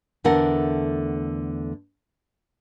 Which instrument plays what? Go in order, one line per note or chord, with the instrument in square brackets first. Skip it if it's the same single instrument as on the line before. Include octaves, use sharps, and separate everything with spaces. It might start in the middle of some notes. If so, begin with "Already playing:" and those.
[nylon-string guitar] E2 D3 A3 A#4 F#5